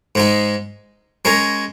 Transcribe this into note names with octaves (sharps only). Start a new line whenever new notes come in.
G#2 G#3 D#4
G#3 C#4 A#4 C#5